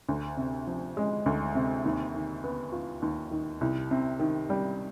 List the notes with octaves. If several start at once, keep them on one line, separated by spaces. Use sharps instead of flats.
D2
C3
F3
G#3
D2
C3
D#2
D#3
B3
F4
D#2
D#3
C2
C3
D#3
G3